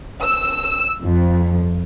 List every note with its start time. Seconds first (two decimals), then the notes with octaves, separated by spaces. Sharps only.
0.23 E6
1.03 F2